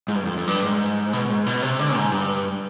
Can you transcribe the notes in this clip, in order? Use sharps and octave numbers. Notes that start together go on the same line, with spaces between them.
G#2
G2
F2
F2
G2
G#2
B2
B2
G#2
B2
C3
D3
G#2
G2